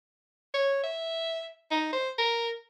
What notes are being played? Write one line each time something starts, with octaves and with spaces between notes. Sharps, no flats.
C#5
E5
D#4
C5
A#4